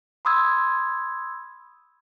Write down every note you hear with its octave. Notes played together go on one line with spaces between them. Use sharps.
B5 C6 D#6 E6 G#6